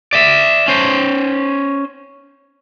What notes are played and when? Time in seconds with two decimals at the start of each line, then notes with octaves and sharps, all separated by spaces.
0.13 D5 E5
0.68 C#4 C5